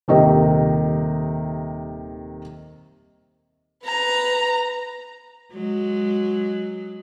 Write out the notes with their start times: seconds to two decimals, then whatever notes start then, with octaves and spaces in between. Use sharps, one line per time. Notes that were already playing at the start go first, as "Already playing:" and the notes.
0.08 D#1 C3 D#3 D#5
3.85 B4 A#5
5.53 F#3 G#3